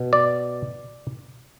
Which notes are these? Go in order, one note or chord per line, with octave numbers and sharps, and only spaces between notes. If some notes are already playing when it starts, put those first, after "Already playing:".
Already playing: B2
D5